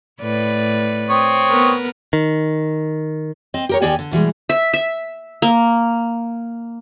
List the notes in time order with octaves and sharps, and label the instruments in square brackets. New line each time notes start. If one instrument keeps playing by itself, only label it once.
[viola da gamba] A2 B4 D5
[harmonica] C4 C#5 D#6
[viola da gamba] B3 A#4 B4
[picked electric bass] D#3
[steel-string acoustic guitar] C4 D#5
G4 A#4 C#5
D#2 D#3 G4 D5 G5 G#5
D3
B2 E3 G3 G#3
[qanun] E5
E5
A#3